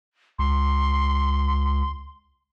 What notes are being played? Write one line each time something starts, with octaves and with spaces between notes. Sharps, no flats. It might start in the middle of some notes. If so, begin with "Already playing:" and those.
C#2 C6